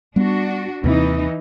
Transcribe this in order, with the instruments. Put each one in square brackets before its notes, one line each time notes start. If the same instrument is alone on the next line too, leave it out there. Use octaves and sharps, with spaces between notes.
[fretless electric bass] G3 B3 [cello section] D4 F#4
[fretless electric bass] D#2 C3 C4 [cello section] E3 D#4 D#5